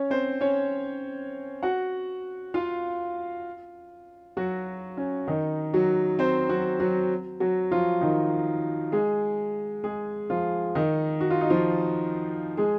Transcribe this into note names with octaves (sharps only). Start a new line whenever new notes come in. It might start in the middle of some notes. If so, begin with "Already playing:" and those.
Already playing: C#4 C#5
C4 C5
C#4 C#5
F#4 F#5
F4 F5
F#3 F#4
C#4
D#3 D#4
F#3 F#4
C4 C5
F#3 F#4
F#3 F#4
F#3 F#4
F3 F4
D#3 D#4
G#3 G#4
G#3 G#4
F3 F4
D#3 D#4
F#4
F4
D#4
F3 F4
G#3 G#4